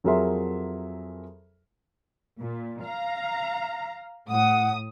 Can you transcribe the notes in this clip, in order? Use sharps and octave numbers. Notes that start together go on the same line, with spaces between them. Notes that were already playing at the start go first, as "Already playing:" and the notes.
F2 F#3 G#4 A#4 E5 C6
A#2
F5 A#5
A2 F#5 D#6